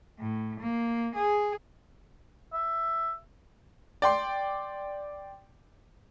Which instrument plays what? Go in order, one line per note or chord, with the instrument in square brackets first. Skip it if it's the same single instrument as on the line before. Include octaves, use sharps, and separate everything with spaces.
[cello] A2
A#3
G#4
[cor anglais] E5
[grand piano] D5 G5 C6